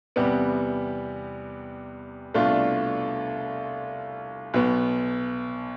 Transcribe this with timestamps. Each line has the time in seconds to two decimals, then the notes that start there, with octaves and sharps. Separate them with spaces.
0.16 E2 C3 G3 B3
2.34 C2 B2 A3 D4 F4
4.54 B1 B2 B3